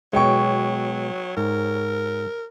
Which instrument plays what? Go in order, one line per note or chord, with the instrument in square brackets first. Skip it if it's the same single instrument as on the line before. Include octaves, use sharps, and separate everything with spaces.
[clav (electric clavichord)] B2 G#3 [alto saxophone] F#3 [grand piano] C#5 G5 C#6
[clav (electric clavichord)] G#2 [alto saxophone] A#4